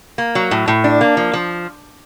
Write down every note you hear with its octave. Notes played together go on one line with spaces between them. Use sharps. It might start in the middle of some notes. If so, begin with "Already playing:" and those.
A#3
F#3
A2
A2
D4
A#3
F3
F3